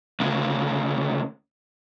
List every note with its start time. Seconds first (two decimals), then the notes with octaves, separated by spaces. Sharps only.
0.20 D2 C#3